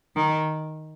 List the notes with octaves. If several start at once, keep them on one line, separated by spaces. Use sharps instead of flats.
D#3